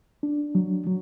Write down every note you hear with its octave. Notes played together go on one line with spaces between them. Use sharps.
D4
F#3
F#3